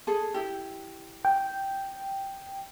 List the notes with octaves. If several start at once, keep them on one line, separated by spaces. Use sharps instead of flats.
G#4 A4
E4 G4
G5